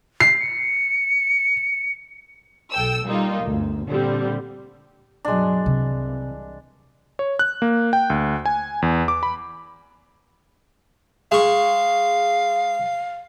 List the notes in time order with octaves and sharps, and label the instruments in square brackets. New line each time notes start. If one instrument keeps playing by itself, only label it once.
[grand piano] C7
[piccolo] C#7
[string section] B1 A4 G5 E6
G3 A#3 D#4 F4
G1 D2
A#2 D3 G3 C4
[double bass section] B1 G2 F#3 [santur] G#3 D4
[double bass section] C2 E3 [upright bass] C3
[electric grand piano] C#5
F#6
A#3
G5
D2
G#5
E2
D6
B5
[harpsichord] G#3 C#6 [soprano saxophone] F5